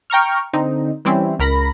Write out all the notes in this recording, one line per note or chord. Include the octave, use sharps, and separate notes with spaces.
G5 A#5 C#6 F6
D3 C4 D#4
E3 G3 C4 C#4 E4
C#2 A#4 B5 A#6